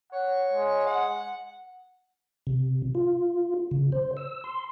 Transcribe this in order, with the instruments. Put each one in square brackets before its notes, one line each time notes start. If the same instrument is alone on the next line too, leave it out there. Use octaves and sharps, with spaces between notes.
[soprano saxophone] C#5 [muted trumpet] F#5
[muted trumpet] G#3
[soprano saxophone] F#5
[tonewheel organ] C3
F4
C#3
C5
E6
C6